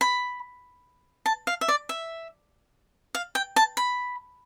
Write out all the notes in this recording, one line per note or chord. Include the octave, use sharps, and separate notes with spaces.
B5
A5
F5
E5
D5
E5
F5
G5
A5
B5